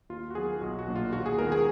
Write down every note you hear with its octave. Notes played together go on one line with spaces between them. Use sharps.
D#2 F4
F#4
D#3 F#3 B3 G#4
B1 F#4
F#4
A#2 F#3 A#3 D4
F4
D#2 F#4
G#4
D#3 G#3 B3 A#4
G#4